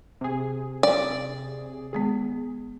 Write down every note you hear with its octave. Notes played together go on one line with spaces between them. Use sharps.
C3 G#4
D5
D#3 G#3 B3 G#4